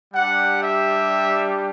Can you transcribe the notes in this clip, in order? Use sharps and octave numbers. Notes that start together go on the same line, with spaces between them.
G3 D4 G4 F#5
E5